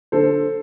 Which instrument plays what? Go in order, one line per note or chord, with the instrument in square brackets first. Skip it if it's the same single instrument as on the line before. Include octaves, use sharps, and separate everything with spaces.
[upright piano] D3 A4 C5